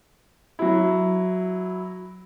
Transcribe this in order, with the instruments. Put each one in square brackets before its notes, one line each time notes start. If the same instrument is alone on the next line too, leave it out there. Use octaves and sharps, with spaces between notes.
[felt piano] F#3 E4